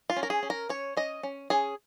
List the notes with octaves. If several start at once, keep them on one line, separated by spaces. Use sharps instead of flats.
F4
C#4
A#4
G#4
C#4
A#4
C#4 C#5
C#4 D#5
C#4
C#4 G#4